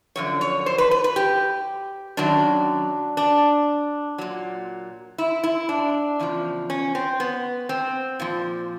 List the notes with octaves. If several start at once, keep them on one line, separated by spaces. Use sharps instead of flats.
F#2 D3 F3 C#5
C#5
C5
B4
B4
B4
G4
F#2 D#3 F#3 D4
D4
A#2 F#3
E4
E4
D4
E2 C#3 F3
C#4
C4
B3
C4
A#2 F3